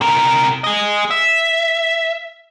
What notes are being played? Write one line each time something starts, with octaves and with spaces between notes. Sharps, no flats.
C3 A#4
G#4 D#5
E5